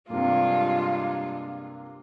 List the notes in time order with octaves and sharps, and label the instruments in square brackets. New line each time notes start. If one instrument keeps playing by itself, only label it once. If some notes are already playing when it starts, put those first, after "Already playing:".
[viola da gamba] G2 G#3 [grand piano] C3 A#3 [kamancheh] F4